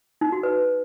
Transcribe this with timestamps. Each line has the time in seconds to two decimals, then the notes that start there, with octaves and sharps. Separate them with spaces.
0.21 D#4
0.32 F#4
0.43 B4